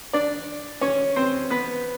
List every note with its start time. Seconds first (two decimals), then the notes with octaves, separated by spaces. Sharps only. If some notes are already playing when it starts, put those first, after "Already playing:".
0.13 D4 D5
0.81 C#4 C#5
1.16 C4 C5
1.50 B3 B4